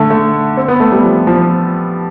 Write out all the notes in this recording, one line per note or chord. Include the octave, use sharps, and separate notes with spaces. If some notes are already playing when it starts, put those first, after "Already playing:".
Already playing: D3 A3
A3
C4
B3
A3
G3
F3
F3